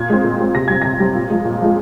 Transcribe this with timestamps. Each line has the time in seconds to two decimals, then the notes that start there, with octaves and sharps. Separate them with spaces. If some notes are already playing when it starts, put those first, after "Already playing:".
Already playing: A#2 G#6
0.10 G#3 C4
0.24 A#2
0.39 G#3 C4
0.55 C3 A#6
0.68 G3 C4 G#6
0.82 C3 A#6
1.00 G3 C4
1.15 A#2
1.30 F3 G#3
1.45 A#2
1.60 F3 G#3